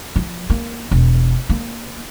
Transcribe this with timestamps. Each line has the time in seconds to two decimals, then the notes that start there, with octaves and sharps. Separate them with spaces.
0.16 F3
0.50 A#3
0.91 E1
1.50 A#3